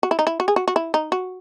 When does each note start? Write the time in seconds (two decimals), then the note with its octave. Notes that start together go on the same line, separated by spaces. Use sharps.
0.03 F#4
0.11 E4
0.19 D#4
0.27 E4
0.40 F#4
0.48 G#4
0.56 F#4
0.68 F#4
0.76 E4
0.94 D#4
1.12 F#4